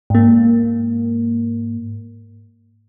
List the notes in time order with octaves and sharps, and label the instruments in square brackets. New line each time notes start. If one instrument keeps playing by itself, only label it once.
[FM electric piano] G#2 A#3